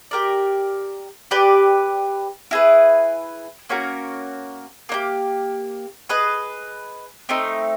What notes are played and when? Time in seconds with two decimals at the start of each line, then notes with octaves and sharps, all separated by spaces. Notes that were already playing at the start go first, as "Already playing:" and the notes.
0.11 G4 A#4 D5
1.31 G4 B4 D5
2.51 E4 G#4 B4
3.69 A#3 C#4 F#4 A#4
4.89 A#3 D#4 G4
6.09 G#4 B4 D#5
7.29 A3 C4 D#4